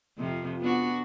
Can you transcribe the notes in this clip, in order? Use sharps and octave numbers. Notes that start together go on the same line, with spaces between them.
F2 C3 F3
B3 D4 F#4